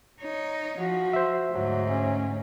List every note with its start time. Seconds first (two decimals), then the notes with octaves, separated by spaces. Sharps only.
0.20 D#4 C#5
0.78 F3 F#4
1.13 C5 E5
1.52 D2 G#2 F#3
1.90 C#4